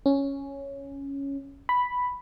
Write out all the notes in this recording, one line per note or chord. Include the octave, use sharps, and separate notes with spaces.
C#4
B5